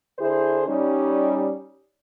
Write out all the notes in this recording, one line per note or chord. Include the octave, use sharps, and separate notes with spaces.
D3 E4 G#4 C5
G3 C#4 D#4